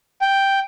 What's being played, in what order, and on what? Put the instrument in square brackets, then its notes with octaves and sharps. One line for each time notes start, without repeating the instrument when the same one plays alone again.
[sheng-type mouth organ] G5